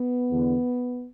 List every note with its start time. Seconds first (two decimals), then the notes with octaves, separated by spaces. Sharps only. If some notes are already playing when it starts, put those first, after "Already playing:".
Already playing: B3
0.31 E2 D3